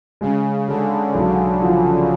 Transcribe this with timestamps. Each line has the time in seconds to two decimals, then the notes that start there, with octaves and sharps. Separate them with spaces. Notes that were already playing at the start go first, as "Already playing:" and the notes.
0.21 C#3 G#3
0.68 D3 G#3
1.15 B1
1.63 F3